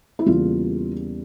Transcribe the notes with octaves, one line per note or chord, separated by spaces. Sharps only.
E4
E2 C#3 E3 G3 A#3 F4